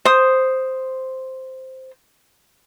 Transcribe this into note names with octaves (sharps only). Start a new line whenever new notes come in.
C5 D#6